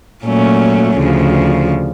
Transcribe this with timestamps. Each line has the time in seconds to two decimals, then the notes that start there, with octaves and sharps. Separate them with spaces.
0.23 A#2 F#3 A3 C#4
0.96 D2 C#3 F3